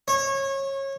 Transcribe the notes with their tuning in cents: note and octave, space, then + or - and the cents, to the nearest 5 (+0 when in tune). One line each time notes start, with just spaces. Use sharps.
C#5 -25